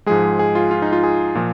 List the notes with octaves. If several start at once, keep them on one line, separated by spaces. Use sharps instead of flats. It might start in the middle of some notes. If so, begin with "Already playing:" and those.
G#2 F3 G#3 G#4
G#4
F4
F4
D#4
F4
G#4
A#2 F3